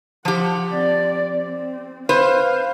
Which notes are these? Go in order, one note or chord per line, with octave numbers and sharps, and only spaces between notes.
F3 G4 F#5
C4 D5
C4
B4 C5 F5